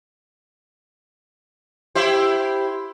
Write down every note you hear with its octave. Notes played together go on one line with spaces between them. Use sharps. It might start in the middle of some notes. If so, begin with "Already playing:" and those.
E4 G4 C5